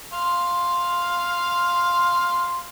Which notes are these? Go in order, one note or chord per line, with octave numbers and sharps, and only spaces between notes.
F5 C6